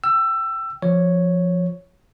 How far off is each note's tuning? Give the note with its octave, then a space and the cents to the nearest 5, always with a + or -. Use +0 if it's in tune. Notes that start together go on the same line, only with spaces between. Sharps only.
G5 -15 E6 +20
F3 +0 C#5 +0